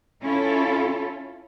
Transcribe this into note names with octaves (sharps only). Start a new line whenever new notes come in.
C#4 E4 F4 A4